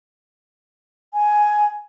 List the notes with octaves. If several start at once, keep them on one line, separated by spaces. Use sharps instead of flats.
G#5